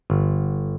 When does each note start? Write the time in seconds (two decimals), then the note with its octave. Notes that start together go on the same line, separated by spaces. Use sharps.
0.10 G1